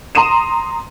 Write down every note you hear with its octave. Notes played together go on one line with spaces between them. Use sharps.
A#5 C6 D#6 D#7 E7